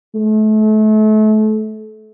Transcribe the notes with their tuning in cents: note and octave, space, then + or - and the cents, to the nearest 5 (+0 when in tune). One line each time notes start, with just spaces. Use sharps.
A3 -30